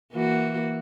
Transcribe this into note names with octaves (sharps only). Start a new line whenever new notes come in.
E3 A#3 F#4